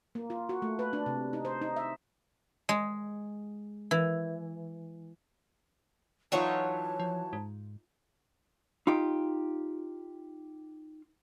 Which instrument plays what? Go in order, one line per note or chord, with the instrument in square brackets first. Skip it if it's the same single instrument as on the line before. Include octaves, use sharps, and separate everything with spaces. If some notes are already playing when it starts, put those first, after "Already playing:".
[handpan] A#3
F4
F#4
A3
B4
D4
C3
D#4
C5
D#4
E5
[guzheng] G#3
E3
[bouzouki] E3 F#3 C#5 [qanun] D#4 F4 E5 [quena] A5
[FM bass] F3
G#2
[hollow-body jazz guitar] D#4 F4 G4